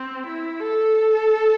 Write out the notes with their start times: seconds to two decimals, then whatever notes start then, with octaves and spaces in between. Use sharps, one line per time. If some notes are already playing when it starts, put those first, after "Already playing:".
Already playing: C4
0.26 E4
0.60 A4